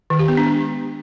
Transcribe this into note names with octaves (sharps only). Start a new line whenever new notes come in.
D#3
G4
B3
D4
G#3